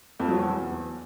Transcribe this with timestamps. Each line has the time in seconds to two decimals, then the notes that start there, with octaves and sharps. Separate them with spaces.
0.19 F2
0.29 F#3
0.38 E2